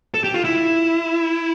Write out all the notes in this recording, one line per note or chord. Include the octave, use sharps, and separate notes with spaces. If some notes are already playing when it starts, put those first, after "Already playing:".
A4
G4
F4
E4